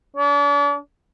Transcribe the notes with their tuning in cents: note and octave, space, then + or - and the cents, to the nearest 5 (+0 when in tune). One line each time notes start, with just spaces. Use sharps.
D4 -40